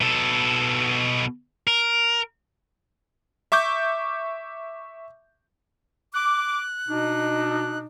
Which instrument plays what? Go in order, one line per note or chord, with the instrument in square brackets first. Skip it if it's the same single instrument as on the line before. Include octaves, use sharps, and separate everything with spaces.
[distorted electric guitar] B2 A4
A#4
[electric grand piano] E5 C#6 D6 G6
[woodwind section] D6 [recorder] F#6
[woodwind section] B2 D4 D#4